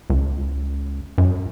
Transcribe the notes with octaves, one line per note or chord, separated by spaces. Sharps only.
C#2
F#2